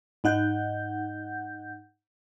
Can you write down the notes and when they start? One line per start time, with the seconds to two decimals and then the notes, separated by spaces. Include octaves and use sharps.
0.24 G#2 D#4 F#5 G6